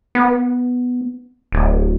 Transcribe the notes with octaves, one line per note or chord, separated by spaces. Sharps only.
B3
D1